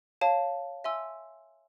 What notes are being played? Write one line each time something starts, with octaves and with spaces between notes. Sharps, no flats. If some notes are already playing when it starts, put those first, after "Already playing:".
C#5 F5 A5
E5 G#5 C6 E6